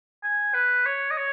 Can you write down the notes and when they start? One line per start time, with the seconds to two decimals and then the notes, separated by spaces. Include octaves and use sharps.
0.23 G#5
0.54 B4
0.86 C#5
1.11 D#5
1.17 C#5